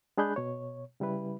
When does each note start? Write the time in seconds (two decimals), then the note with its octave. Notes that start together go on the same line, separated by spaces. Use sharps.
0.18 G#3 D4 G#4 B5 F#6 G6
0.36 B2 C#5
1.00 C#3 G3 E4 B4